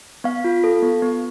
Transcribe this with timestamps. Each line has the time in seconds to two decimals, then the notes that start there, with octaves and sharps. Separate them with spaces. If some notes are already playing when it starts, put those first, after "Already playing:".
0.24 B3 F5
0.44 F4
0.64 A4
0.82 B3
1.02 B3